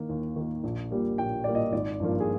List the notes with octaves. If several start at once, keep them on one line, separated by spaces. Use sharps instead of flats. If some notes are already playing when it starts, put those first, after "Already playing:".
Already playing: D#3 A#3
D#2
D#3 A#3
A#1
A#2 G3 A#3
A#1 G5
A#2 G3 A#3 D5
D#5
G#1 D5
G2 F3 A#3
G#4